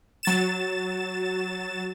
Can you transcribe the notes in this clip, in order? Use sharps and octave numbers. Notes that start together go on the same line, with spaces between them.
F#3 A6 E7